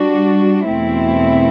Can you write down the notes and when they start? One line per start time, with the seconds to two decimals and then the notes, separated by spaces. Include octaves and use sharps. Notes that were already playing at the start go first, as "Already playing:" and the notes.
Already playing: G3 D4 F#4
0.68 E2 B2 A3 C4 E4